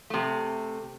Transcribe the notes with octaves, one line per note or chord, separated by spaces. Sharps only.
C3 A3